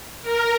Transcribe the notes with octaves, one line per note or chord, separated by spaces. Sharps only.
A#4